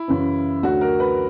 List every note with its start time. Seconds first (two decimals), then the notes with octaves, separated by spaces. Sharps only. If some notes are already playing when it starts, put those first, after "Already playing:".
Already playing: E4
0.08 F#2 C#3 E3
0.63 D2 D3 F#3 F#4
0.81 A#4
1.00 B4